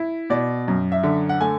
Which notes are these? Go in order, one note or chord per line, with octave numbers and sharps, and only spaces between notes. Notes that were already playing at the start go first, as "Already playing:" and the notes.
Already playing: E4
B2 D5
F#2
E5
D3
F#5
A3 G#5